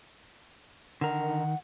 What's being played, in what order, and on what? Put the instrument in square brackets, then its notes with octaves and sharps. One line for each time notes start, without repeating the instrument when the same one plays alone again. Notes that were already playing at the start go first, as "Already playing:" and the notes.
[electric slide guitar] D3 A#4 [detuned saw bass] D#3 [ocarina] F#5